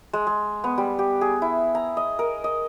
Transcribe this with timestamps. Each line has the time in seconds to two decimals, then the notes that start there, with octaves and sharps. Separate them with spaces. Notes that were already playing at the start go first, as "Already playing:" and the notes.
0.13 G#3
0.27 G#3
0.64 B3
0.78 G3
0.99 G4
1.21 G#4
1.42 E4
1.75 A#5
1.97 D#5
2.19 A#4
2.44 D#5